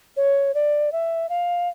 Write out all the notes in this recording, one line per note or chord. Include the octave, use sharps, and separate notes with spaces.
C#5
D5
E5
F5